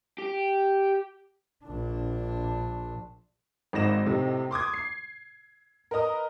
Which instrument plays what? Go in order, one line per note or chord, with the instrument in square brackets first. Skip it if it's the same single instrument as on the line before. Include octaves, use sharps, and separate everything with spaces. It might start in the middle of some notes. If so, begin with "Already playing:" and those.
[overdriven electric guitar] G4
[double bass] A#1 D4
[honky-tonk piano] G#1 G#2 D#4 A#6 E7
A2 C3 D#4
C6 D6 D#6 G#6
C7
A#4 B4 D#5 A#5 D#6